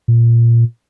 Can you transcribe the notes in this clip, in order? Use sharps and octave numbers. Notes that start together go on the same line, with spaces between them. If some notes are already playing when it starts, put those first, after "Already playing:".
A#2